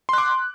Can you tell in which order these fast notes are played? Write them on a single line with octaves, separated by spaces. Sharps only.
C6 F#6 D6